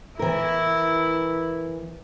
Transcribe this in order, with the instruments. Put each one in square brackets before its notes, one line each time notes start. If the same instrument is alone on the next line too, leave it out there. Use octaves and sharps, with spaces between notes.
[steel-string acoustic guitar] E3 A#4 [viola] E4